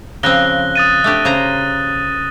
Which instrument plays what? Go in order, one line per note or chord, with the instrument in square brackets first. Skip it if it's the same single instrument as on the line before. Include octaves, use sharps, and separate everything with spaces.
[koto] C#3 F3 C4 [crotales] F#6 A#6 G7
[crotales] D#6 A6 D#7
[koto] A3 D4 G4
C#3 C5 A#5